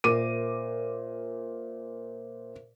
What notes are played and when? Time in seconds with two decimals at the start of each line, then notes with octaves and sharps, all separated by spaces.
0.04 A#2 A#4 C5 E5 D6 D#7